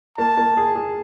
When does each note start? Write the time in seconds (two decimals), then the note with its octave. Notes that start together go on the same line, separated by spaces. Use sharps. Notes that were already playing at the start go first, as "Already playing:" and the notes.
0.18 A#3 A5
0.37 A#3
0.57 G#4
0.75 G#4